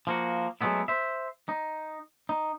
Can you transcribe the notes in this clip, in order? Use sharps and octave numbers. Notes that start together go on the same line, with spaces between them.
F3 A#3 F#4
F#3 G#3 A3 B3 E4
C5 E5
D#4
D#4